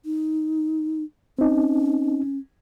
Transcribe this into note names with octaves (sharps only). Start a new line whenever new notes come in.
D#4
C4 C#4 D#4